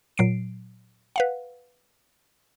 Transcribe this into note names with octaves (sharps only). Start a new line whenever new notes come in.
A#2 F#3 C7 D7
B4 F5 F#5